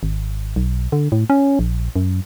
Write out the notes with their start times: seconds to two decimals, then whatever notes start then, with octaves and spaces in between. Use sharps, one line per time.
0.03 G#1
0.56 B1
0.92 D3
1.12 A2
1.30 C#4
1.59 A#1
1.96 F#2